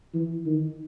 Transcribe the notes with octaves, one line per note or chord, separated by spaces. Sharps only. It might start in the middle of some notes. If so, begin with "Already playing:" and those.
E3
D#3